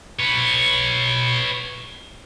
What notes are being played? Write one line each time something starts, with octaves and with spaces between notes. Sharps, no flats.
B4 C#5